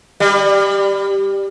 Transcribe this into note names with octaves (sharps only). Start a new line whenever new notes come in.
G3